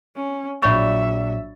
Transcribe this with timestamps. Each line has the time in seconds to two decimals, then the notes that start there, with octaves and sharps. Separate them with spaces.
0.16 C#4
0.62 A#1 F#3 C#5 D5 E5 B5 C#6 A6